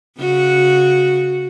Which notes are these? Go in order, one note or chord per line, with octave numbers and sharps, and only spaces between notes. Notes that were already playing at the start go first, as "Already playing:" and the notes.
C#3 F#4